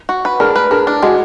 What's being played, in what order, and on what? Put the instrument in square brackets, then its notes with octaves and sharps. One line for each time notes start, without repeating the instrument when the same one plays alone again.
[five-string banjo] F#4
B4
[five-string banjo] D4 [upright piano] G#4 A#4
[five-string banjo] B4
[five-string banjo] D4 [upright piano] G#4 A#4
[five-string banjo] D4
[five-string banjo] G#3 [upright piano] F#4 G#4